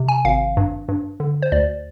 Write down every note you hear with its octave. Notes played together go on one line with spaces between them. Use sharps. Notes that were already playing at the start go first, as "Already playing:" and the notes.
Already playing: C3
G#5
G#1 F5
G2
G2
D3
C5
D2 D5